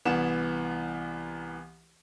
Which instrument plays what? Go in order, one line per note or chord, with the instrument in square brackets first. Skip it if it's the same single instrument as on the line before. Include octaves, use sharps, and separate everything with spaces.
[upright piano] C2 E3 B3 E7